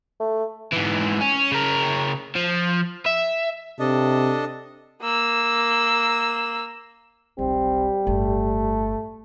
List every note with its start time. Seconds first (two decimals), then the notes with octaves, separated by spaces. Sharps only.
0.20 A3
0.72 G#2 E3
1.21 C#4
1.52 C#3 A#4
2.36 F3
3.06 E5
3.79 C3 D4 A4 D#5
5.02 A#3 E6
7.39 F1 B1 G3 C4
8.07 G1 A2 A3